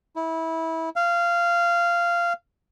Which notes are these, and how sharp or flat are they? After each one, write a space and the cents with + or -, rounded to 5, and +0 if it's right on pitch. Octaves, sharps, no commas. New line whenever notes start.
E4 -20
F5 -15